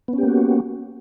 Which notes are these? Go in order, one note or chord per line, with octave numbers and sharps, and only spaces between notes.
A#3 B3 C#4 F#4 G4